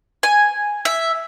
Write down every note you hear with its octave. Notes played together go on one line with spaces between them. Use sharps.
G#5
E5